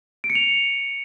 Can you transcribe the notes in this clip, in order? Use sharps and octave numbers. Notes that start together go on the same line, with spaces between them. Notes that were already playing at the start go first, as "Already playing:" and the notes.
D7
C#7
F7